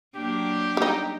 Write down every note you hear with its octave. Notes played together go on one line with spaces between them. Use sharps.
F#3 A#3 D4 G4
G3 D#4